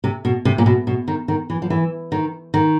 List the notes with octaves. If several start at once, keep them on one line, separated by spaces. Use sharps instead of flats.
C3
B2
C3
A#2
B2
B2
D#3
D#3
E3
F3
E3
D#3
D#3